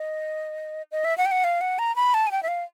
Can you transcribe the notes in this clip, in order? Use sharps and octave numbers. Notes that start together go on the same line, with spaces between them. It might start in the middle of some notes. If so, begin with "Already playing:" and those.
Already playing: D#5
D#5
E5
F#5
G5
F#5
F5
F#5
A#5
B5
A5
G#5
G5
E5
F5